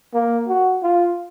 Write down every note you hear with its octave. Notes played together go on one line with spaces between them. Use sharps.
A#3
F#4
F4